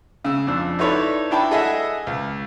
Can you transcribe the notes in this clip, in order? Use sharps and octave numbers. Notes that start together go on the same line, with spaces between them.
C#3 E6
F2 D4 E6
D#4 E4 A4 B4 C#5 D5
D4 E4 G5 A5 B5
G#4 A4 D#5 E5 F#5 G#5
C#2